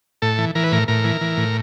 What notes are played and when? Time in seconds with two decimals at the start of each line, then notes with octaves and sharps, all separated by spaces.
0.22 A2 A4
0.38 E3
0.55 E3 A#4
0.64 B4
0.72 A2 A#4
0.88 A2 A#4
1.04 E3
1.21 E3
1.37 A2